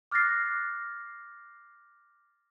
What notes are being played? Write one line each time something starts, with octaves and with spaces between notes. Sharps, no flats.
D6 F6 F#6 A6 A#6 C7